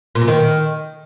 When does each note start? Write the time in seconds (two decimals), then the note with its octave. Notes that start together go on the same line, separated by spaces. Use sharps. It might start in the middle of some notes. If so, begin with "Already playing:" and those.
0.15 A#2
0.22 F#2
0.28 D#3